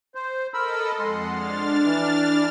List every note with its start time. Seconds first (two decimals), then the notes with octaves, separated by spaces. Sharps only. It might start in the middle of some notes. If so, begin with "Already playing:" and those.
0.15 C5
0.54 A4 A#4 D#5 B5 E6
0.99 F2 G#3 F#5 C6
1.29 D4 F6 A6
1.84 E3